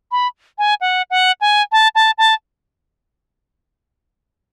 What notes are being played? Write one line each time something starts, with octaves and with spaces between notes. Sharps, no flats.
B5
G#5
F#5
F#5
G#5
A5
A5
A5